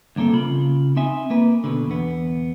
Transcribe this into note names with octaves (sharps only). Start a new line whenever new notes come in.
D2 G2 A#3 C4 A4
C#3 F4 B5
C4 D#4 E5 G#5
A#3 B4
B2 D3
E2 B3